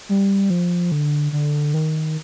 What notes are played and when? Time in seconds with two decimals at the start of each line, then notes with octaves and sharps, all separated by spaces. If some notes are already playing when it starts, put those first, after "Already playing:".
0.09 G3
0.50 F3
0.92 D3
1.32 D3
1.74 D#3